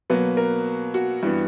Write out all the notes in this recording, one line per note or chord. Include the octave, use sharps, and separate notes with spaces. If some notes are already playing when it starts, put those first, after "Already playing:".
B2 F#3 A#3 B4
A#4
F#4
G2 E3 B3